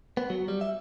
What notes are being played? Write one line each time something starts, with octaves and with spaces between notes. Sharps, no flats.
B3
F#3
G3
E5